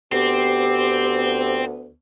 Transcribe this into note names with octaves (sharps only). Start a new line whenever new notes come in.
D2 B3 C4 G4